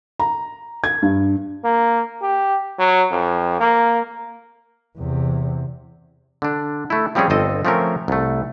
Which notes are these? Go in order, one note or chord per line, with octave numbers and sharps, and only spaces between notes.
A#5
G#6
G2
A#3
G4
F#3
F2
A#3
E2 C3
D3 D4
A3 E4
F3 G3 C4 C#4 G#4
G1 C4 A4 D#5
F3 A3 C4 C#4 A#4
C2 A3